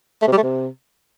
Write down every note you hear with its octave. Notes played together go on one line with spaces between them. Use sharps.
A3
C3
G3
A3
C3